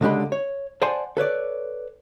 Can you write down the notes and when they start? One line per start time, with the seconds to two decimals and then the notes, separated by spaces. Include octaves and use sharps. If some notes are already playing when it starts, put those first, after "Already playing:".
0.01 C#2 D3 G#3 G4 B5
0.32 C#5
0.82 C5 D5 F#5 G#5 A5 C6
1.17 A4 B4 C#5 D5